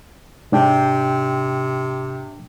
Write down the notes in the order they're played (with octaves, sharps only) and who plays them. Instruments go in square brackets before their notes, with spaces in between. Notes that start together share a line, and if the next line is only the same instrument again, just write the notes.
[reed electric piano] G#2 D4 G5 [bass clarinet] C3